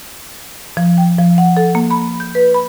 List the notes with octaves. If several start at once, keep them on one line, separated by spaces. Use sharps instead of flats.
F3
G5
F3
F#5
A4
A#3
B5
G6
B4
B5